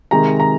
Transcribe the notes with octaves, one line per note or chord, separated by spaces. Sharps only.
C3 D#3 G#3 A#5
A#5